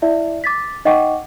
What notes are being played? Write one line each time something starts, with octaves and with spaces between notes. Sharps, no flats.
E4 D5 E5
D6 A6 B6
D#4 D#5 F#5 G5 C#6 D6